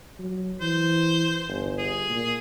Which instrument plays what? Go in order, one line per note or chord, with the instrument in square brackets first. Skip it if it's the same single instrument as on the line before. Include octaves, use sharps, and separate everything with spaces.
[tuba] F#3
[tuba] E3 [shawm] C5
[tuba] G1
[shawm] G#4
[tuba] A#2